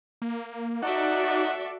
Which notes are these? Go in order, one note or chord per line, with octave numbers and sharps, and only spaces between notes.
A#3
D#4 F#4 A4 D5 E5 F#5